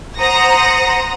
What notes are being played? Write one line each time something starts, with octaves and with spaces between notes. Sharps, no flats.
C5 F#5 A#5 D#6 A#6